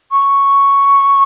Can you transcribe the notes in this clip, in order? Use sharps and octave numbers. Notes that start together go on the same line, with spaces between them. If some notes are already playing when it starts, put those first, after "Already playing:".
C#6